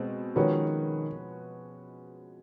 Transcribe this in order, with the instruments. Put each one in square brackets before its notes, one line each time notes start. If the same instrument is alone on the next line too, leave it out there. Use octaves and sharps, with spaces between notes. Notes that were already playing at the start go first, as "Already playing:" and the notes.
Already playing: [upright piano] B2 G#3 C4
[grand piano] D#3 [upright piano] F3 G#3 C#4 F#4 B4